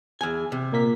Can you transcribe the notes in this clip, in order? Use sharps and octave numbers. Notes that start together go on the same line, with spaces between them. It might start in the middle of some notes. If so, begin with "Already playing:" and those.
E2 G#5
C3
A#2 A#3 B6